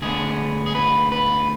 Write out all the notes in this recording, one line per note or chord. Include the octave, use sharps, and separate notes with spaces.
D2 D3 G#3 B3 G#4
G#4
B4
B4